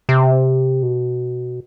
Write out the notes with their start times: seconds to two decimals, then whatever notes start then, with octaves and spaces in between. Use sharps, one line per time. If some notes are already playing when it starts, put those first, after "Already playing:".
0.09 C3
0.82 B2